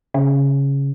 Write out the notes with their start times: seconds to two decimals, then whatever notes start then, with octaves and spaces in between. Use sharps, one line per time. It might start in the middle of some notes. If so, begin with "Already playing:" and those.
0.14 C#3